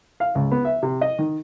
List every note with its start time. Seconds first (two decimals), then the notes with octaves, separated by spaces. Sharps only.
0.20 F5
0.35 C#2
0.52 B3
0.65 E5
0.83 C3
1.01 D#5
1.19 D#3